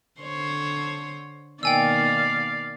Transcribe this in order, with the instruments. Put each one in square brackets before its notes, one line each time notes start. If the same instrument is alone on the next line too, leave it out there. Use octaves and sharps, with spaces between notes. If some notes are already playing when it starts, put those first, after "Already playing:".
[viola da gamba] D3 C5 C#5
[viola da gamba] B2 D#3 A#3 [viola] D5 F5 [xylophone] G5 G#5 E6